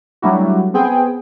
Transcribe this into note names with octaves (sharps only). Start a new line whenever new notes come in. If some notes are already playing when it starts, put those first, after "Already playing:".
F#3 G3 A3 D4 E4 F#4
B3 C4 G#4 G5